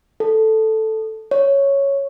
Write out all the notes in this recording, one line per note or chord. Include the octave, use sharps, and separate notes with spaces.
A4
C#5